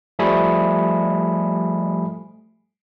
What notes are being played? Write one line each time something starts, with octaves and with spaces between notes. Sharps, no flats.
F3 G3 A3 G#5 B5 D#6